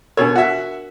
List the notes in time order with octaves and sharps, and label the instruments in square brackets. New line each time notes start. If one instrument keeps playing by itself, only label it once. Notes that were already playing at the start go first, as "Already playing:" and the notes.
[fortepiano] B2 C#5 [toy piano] D4 A#4
[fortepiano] F#4 E5